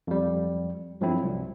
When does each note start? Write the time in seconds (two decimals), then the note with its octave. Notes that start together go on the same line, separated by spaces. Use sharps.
0.07 F2 G3
1.01 G2 F3 F#3 A3 C4 E4
1.23 C2